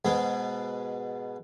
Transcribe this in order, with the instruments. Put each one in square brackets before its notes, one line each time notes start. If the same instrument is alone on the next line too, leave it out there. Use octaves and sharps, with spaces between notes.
[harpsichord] G#2 B2 B3 G#4